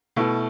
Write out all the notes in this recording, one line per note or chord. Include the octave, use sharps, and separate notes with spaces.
B2 A3 E4